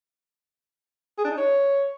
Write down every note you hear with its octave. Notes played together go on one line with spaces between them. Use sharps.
G#4
D4
D#4
C#5